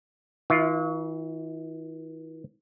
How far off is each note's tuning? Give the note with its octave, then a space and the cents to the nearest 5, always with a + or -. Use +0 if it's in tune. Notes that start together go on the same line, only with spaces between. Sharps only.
E3 -45 F4 +0 E5 -20